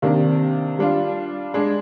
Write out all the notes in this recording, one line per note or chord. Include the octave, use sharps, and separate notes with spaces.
C3 D#3 A#3 D4
G3 D4 F4
G#3 D4 G#4